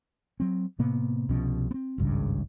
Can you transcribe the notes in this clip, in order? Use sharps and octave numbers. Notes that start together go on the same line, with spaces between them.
F#3 C4
A2 C3 A#3 B3
C2 B2 F3 C#4
B3 C4
G#1 C#2 G2 C#3